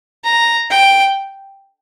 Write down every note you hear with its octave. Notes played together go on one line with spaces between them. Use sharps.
A#5
G5